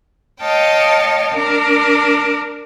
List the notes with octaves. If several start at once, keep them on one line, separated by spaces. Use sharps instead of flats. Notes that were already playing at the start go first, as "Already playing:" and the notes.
C#5 D#5 F5 G5 A5
D4 A#4